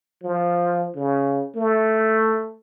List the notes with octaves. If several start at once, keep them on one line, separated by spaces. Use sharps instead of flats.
F3
C#3
A3